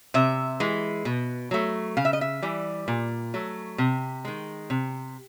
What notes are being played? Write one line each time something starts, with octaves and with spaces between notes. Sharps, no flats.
C3 E5
E3 G#3
B2
F#3 A3
C#3 F5
E5
D#5
E5
E3 G3
A#2
F#3 A3
C3
D#3 G#3
C3